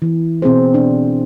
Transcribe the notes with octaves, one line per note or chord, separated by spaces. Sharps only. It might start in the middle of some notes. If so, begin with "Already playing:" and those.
E3
B2 C4 G#4 C5
D4